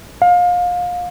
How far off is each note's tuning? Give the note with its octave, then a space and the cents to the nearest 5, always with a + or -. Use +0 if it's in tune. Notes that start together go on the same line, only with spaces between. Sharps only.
F5 +30